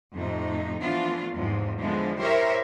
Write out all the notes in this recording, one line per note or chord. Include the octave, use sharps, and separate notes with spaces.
F2 A2 C3 A3 D#4
E3 F3 A3 B3 D4 F4
E2 G#2 C3 F3
D3 E3 F3 G#3 B3
E4 G4 A#4 C5 C#5 E5